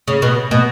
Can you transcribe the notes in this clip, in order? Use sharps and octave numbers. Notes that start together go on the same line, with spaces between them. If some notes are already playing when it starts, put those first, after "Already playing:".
C#3
B2
B2